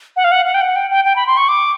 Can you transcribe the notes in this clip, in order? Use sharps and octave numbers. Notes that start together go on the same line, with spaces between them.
F#5
F5
F#5
F#5
G5
F#5
G5
G5
G5
B5
C6
C#6
D6